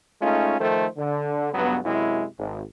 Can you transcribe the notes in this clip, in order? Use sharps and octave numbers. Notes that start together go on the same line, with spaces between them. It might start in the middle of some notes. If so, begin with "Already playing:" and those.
G#3 A3 C#4 D#4 F4
D#3 F3 A3 A4 C5
D3
C#2 G2 F#3 B3
F#2 C3 G#3 E4
G#1